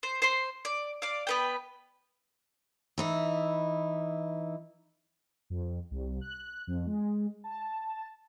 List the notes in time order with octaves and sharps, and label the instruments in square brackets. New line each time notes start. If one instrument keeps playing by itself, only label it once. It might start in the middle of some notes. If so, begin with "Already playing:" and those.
[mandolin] C5
C5 C6
D5
D5 F5
B3 B4 G5
[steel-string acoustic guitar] E3 D#4 E4
[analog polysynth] F2
C2
F#6
F2
G#3
A5